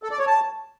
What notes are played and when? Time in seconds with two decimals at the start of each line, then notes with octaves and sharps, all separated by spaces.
0.03 A4
0.11 D5
0.19 C#5
0.27 A5